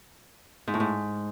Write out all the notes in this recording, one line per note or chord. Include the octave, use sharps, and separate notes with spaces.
G#2
A2
G#2